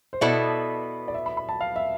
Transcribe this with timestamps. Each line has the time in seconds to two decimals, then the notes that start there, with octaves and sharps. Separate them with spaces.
0.13 C5
0.21 B2 B3 E4 A4 D5
1.08 D5
1.14 E5
1.26 B5
1.37 B5
1.49 A5
1.61 F5
1.76 E5